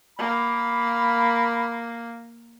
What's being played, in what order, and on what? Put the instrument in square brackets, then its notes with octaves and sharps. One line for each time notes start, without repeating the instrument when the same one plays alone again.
[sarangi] A#3 [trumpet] B5